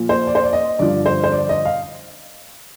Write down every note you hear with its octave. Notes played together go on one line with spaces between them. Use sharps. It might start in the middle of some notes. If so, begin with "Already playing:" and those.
Already playing: A#2 F3
C5
D5
C5
D5
D#5
G2 D3 F3 D5
C5
C5
D5
D#5
F5